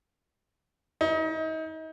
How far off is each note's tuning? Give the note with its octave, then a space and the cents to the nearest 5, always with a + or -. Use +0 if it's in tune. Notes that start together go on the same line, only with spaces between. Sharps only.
D#4 +35